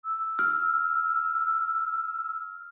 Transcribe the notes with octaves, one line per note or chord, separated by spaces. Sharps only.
E6
F6